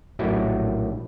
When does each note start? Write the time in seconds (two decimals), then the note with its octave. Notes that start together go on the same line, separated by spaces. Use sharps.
0.19 A#1 A2 F#3 E4 G4 G5